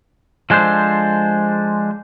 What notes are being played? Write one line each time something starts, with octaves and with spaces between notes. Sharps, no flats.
F3 G#3 D4 A4 C5